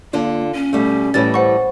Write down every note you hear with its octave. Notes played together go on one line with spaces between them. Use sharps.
D3 A#3 D4 F4
C#4
B2 G3 A3
A2 E3 G3 C#5 A6
C5 F#5 C#6